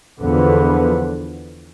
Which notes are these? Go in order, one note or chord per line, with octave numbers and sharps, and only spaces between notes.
E2 D3 F3 B3